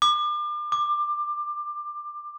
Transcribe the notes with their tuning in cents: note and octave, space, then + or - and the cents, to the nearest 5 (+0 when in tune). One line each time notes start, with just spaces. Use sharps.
D6 +35
D6 +20